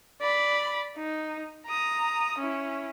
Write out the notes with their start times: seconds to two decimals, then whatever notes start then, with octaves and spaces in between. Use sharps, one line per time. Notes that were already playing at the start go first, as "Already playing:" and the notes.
0.21 D5 B5
0.97 D#4
1.66 A#5 D#6
2.39 C#4 E4